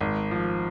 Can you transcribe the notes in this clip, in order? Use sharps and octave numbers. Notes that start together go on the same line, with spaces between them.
G#1
F3